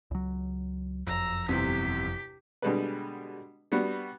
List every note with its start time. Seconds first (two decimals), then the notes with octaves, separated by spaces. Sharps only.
0.11 C#2 F#3
1.07 F#1 F2 A#5 E6
1.48 G1 E2 C3 G4 B6
2.62 B2 D3 G3 G#3 D4 B4
3.72 G3 B3 D4 F#4